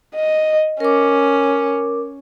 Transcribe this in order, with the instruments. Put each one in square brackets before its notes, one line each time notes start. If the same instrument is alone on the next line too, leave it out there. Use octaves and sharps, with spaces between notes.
[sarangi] D#5
[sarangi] C#4 [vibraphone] A#4 D6